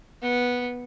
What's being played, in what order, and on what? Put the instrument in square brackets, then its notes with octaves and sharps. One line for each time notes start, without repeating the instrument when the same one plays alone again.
[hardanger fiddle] B3